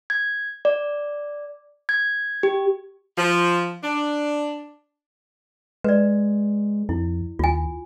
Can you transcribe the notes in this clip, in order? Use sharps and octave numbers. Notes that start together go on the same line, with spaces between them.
G#6
D5
G#6
G4
F3
D4
G#3 B4 D5
F2 E4
D#2 F4 G#5